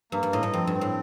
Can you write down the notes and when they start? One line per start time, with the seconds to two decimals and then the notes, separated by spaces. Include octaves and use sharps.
0.12 G2 A#3
0.23 G2
0.33 A2 D#5
0.43 G2
0.53 F2 C4
0.67 G2
0.74 C4
0.81 A2